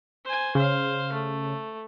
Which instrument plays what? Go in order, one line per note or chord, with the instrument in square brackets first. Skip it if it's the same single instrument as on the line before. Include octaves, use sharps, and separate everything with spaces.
[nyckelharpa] C5 G#5
[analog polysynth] C#3 [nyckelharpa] C5 F5
[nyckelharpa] A3